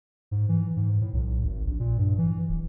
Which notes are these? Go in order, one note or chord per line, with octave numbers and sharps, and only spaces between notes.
G#2
E3
G#2
A2
B1
G#1
A#1
A#2
G2
E3
D1